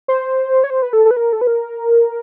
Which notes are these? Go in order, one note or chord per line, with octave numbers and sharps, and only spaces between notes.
C5
C#5
C5
B4
A4
A4
B4
A#4
A4
B4
A#4